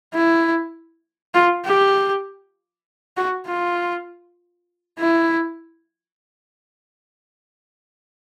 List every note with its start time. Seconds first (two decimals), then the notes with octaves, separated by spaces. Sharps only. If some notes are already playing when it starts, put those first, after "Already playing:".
0.14 E4
1.34 F4
1.65 G4
3.17 F#4
3.47 F4
4.99 E4